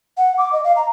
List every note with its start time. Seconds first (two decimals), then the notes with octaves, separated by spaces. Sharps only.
0.18 F#5
0.38 D6
0.53 D#5
0.64 F5
0.76 A#5